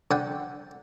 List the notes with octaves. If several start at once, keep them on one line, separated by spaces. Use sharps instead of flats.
D3 F#5 G5